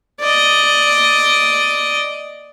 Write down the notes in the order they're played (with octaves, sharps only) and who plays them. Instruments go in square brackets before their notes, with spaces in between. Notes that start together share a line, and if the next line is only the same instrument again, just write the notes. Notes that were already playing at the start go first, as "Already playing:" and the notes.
[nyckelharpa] D5 D#5